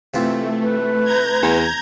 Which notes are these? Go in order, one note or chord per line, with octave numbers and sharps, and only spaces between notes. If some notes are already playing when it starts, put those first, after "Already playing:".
C3 E3 A3 F4
B4
A#5 G6 G#6
E2